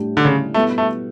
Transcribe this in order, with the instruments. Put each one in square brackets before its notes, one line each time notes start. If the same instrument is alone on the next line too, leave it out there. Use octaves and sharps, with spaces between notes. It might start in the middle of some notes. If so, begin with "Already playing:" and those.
Already playing: [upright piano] A2 G3 D4 G4
[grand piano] D3
C#3
[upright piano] B2 G3 B3 E4 A4 [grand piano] A3
[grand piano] A3